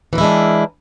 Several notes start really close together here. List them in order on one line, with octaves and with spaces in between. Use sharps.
E3 A#4 E4 G#3 D4